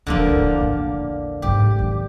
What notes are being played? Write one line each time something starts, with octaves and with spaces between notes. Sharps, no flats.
D#1 D#2 D3 F3 A#3
D1 E4
A#1 E2
A1 G#2 G4
D#3 E3